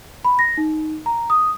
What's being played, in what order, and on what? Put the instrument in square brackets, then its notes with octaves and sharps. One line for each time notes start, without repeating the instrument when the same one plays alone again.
[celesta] B5
A#6
D#4
A#5
D#6